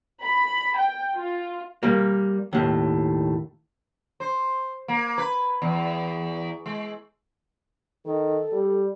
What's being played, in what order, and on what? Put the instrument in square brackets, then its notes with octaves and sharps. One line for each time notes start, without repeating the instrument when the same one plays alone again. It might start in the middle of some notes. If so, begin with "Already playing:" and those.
[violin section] B5
G5
F4
[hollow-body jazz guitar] G3 A#3
D#2 A2
[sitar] C5
A#3
B4
E2
G#3
[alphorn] D#3 [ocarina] A4
[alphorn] G3